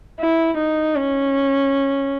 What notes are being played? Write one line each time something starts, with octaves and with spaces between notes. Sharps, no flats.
E4
D#4
C#4